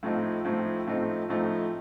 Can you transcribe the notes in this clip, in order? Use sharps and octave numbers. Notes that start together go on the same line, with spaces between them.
A2 F3 A3 C4 D#4
A2 F3 A3 C4 D#4
A2 F3 A3 C4 D#4
A2 F3 A3 C4 D#4